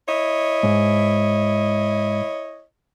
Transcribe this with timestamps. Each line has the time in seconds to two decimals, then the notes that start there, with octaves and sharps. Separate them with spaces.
0.07 E4 C#5 D#5
0.63 G#2